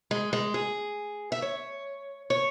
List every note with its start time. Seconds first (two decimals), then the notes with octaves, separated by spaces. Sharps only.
0.11 G#3
0.33 G#3
0.54 G#4
1.32 E5
1.42 C#5
2.30 C#5